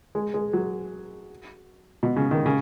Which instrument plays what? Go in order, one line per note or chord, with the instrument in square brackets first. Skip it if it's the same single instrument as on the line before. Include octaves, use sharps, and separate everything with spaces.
[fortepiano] G#3
G#3
F#3
B2
C#3
D#3
C#3